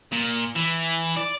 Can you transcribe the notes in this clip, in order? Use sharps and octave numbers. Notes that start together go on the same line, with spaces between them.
A#2
E3
D5